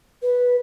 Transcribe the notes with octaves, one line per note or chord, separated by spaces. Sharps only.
B4